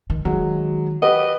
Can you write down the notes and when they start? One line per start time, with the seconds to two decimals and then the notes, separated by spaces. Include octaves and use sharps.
0.10 D#3
0.25 D#3 F#3 G#3
1.02 G4 B4 D#5 F#5